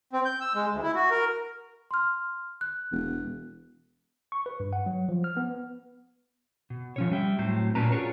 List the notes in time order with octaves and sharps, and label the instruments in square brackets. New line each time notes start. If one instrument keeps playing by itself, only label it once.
[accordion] C4
G6
E6
G#3
D2
E4
F#4
A#4
[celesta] C6 F6
F#6
[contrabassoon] E1
[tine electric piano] C#6
B4
G2
F#5
F#3
F3
F6
B3
[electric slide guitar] B2
F3 C#4 C#5
G3 E5 G5
A2 F#3 C4 C5
A#2 C#4 D4 B4 A#5
F4 F#4 G#4 A#4 C#5